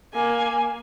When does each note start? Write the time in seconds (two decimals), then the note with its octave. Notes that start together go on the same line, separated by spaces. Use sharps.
0.13 A#3 G#5